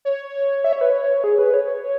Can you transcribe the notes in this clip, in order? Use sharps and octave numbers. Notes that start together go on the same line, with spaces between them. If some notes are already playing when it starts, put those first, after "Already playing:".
C#5
E5
C#5
B4
C#5
G#4
B4
C#5